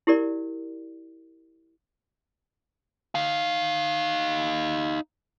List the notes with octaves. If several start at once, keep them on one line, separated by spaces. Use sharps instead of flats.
E4 G4 A#4 D5
D#4 F5